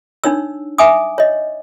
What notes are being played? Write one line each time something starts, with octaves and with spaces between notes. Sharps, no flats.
D4 D#4 C#5 E6
E5 G#5 D6 D#6
C#5 D#5